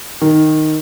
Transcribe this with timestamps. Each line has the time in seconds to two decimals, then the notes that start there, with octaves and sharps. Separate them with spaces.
0.22 D#3